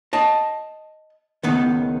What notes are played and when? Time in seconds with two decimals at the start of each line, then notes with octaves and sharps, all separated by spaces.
0.13 D#5 A5
1.43 C#2 D#3 B3